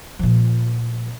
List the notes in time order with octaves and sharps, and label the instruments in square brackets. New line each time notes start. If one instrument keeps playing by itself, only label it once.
[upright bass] A#2 F3